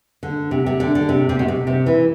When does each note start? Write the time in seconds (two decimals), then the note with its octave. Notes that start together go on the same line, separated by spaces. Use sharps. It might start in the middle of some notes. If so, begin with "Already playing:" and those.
0.23 D3
0.51 C3
0.66 C3
0.80 D3
0.95 D3
1.09 C3
1.29 C3
1.39 B2
1.48 C3
1.67 C3
1.86 E3